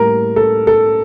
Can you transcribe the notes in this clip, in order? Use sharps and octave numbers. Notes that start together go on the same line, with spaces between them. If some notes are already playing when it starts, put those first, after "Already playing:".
Already playing: A2 G3 A#3 A#4
A4
A4